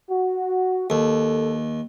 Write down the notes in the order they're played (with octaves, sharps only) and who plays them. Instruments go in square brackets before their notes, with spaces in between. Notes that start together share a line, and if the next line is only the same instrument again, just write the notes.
[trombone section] F#4
[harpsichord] D#2 [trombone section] A4